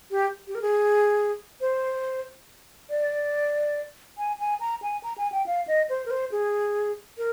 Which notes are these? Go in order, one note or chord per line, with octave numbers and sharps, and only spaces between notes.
G4
G4
A#4
G#4
C5
D5
G#5
G#5
A#5
G#5
A#5
G#5
G5
F5
D#5
C5
A#4
C5
G#4
A#4